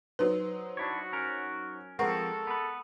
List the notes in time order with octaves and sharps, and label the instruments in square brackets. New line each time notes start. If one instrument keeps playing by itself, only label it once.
[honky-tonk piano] F#3 D#4 C5 [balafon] B4
[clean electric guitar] D4 E4 C#5 [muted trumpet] F#4
[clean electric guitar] C#4 A#4
[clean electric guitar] F3 C4 [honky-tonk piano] G#3 A#4 C#6 [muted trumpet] A4 [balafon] F#5
[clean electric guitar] B3 B4